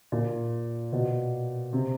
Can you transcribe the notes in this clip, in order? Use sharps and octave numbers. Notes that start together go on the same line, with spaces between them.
A#2
B2
C3